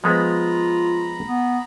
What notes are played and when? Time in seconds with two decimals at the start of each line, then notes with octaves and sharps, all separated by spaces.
0.04 F3 G#3 B3 F4 A#5 B5
1.26 B3